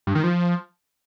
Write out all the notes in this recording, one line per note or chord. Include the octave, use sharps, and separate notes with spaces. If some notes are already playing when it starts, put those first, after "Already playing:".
G2
D#3
F3